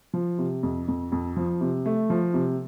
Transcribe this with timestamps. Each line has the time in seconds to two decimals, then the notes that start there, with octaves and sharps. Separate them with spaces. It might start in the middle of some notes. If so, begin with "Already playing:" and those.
0.14 F3
0.39 C3
0.63 F2
0.88 F2
1.12 F2
1.36 F3
1.61 C3
1.86 A3
2.10 F3
2.34 C3